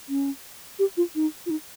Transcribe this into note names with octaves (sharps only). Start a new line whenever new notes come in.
C#4
G4
F4
D#4
F4
D#4